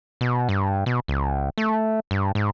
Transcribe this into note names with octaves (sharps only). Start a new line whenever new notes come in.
B2
G2
B2
C#2
A3
G2
G#2